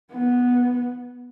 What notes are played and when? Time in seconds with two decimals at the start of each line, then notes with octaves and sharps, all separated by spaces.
0.11 B3